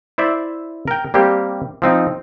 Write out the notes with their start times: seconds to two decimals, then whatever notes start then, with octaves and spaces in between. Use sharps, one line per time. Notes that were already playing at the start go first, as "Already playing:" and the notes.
0.18 E4 C5 D5 E5
0.88 A#4 G5
1.14 G3 A#3 C4 G4
1.82 F3 C4 D#4